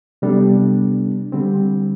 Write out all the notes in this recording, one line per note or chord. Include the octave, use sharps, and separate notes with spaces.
C3 G3 B3 D4 A4
D3 G3 C4